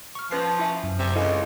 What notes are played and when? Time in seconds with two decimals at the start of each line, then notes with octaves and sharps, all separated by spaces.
0.15 C#6 F6
0.31 F3 C#4 B4 C7
0.59 E4 E5 G#5 C#6
0.84 F#2
0.99 C3
1.16 C#2 E4 G#4 A4 D#5 F5